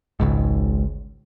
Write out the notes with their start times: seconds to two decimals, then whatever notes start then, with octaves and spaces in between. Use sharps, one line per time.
0.20 G#1 C#2 G#2